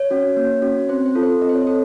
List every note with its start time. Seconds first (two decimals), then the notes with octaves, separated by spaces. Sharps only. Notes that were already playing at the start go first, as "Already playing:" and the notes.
Already playing: C#5
0.11 C#4 F#4
0.37 A#3
0.62 C#4 F#4
0.89 C4 C5
1.06 C5
1.15 F4 A4
1.23 C5
1.41 C4 D#5
1.49 C5
1.55 C#5
1.67 A4 C5